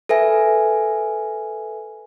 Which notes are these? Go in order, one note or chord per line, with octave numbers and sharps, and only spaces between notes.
A4 B4 E5 G#5